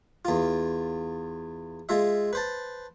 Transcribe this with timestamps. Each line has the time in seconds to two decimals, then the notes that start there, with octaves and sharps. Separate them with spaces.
0.25 E2 F4
1.89 G#3 F4 E5
2.33 B4 C5 A5